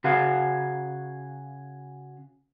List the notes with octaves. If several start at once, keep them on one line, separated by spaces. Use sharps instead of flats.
C#3 F#4 G#4 F5